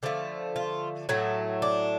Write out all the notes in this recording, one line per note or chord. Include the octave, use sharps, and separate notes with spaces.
D3 F3 A3
F4
A2 F#3 A3
D4